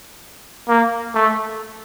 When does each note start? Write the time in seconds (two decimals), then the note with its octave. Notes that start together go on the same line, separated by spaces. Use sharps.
0.69 A#3
1.15 A3